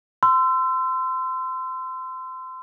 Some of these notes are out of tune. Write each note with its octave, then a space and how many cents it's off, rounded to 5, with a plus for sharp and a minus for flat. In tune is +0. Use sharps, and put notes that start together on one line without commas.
C6 -25 E6 +25